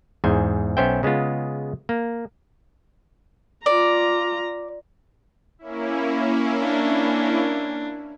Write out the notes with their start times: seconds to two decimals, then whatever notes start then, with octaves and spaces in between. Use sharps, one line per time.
0.24 E2 G#2 C5 G#5
0.77 B1 B3 C#4 C5 E5 G5
1.03 C#3 G#3 B3 F4
1.89 A#3
3.66 F4 D5 A#5
5.59 A#3 C#4 E4
6.62 D4